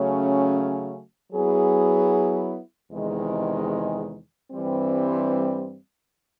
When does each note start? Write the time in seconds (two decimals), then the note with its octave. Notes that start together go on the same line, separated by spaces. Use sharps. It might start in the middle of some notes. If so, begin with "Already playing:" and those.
Already playing: C#3 F#3 A3 C#4
1.33 F#3 B3 E4 G#4
2.91 E2 C3 D#3 G#3
4.51 G2 E3 G3 C4